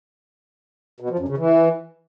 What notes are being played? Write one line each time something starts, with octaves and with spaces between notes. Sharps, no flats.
B2
F3
F#2
C#3
E3